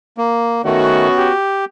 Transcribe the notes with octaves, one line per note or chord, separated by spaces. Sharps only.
A#3
D#3 A3 B3 C#4 F#4
G4